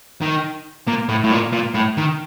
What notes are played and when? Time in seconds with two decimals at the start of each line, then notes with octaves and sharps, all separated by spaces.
0.21 D#3
0.88 A#2
1.09 A2
1.24 A2
1.32 A#2
1.53 A#2
1.75 A2
1.98 D#3